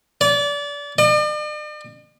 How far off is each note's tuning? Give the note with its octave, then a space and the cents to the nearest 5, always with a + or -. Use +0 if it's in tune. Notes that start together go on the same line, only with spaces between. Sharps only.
D5 -30
D5 +45